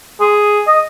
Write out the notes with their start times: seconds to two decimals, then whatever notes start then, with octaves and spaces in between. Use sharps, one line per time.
0.21 G#4
0.68 D#5